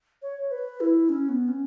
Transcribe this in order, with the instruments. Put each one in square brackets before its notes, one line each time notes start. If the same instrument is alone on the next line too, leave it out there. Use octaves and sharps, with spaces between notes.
[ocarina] C#5
B4
E4
C#4
B3
C#4